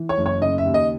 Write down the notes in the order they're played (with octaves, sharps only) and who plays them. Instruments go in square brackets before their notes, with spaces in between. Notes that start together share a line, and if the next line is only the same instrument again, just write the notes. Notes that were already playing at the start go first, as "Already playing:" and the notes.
Already playing: [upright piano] E3
C#5
F#1
C#5
C#3 D#5
E5
D#2
D#5